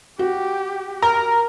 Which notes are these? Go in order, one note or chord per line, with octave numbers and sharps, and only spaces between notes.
F#4 G4
A#4 A#5